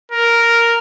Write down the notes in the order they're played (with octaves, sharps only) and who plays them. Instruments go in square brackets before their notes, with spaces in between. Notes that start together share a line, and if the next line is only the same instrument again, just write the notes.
[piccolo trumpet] A#4